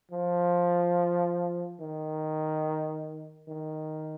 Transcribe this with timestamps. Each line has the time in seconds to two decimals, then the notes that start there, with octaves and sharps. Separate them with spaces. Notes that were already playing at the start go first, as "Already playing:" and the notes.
0.11 F3
1.80 D#3
3.48 D#3